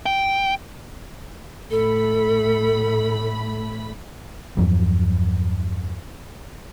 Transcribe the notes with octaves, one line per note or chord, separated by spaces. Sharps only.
G5
A2 A3 A4 B5
E2 G2 F3 F#3